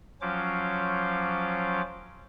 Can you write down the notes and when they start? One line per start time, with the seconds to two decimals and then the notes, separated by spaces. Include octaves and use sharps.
0.21 F3 F#3 C#4 F4 C5 D6